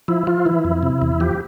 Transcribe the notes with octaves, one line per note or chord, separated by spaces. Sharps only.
F3 E4
F3 F4
E3 E4
F2
C3
E2
F3 G4